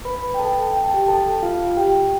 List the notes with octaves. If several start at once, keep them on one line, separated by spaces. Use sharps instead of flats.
B4 B5
G5
A4 A5
G5
A5
G4 G5
A4 A5
F4 F5
G4 G5